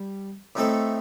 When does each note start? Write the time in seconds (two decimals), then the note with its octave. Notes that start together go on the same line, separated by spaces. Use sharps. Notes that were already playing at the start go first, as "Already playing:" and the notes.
Already playing: G3
0.55 A2 A3 C4 D#4 A4